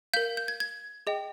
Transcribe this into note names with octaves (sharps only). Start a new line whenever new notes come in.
A#4 F5 G6
G6
G#6
G#6
G#4 D#5 G5